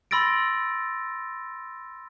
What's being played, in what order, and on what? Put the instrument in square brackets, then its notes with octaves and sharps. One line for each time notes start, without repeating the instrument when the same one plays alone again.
[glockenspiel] B5 C6 E6 A6 A#6 D7